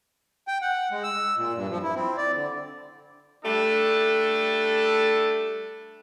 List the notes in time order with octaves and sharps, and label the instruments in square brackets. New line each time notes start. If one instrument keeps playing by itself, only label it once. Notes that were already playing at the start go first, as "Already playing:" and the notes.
[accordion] G5
F#5
G#3
E6
A#2
G2
F3
E4
C4
D5
D3
[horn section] G3 A3 D4 A4